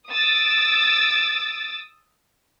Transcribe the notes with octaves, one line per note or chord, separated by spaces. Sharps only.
D#6 E6 A6 D7